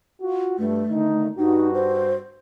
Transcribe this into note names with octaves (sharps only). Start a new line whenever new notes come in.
F4 F#4
G2 A3
D3 D#3 D#4
G2 D#4 F#4
C5